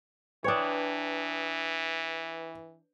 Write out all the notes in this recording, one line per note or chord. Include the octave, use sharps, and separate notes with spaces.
E3 D4 B4 C#5 G5 D#6